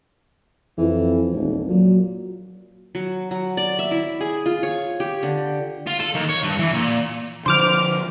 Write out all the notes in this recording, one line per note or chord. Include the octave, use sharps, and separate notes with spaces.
F2 E3
D#1 G#1
A#2 F#3
F#3
F#3
D5
E5
E4
G#4
F4
C#5
G4
D3
F4
A4
D#2
C#5
G2
E3
A#2
D3 F3 C5 D6 F6